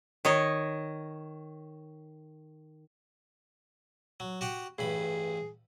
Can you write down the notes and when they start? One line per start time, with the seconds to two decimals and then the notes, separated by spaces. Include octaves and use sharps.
0.25 D#3 C#5 D#5
4.20 F#3
4.41 F#4 G4 F#5
4.79 A1 G2 G#4 B5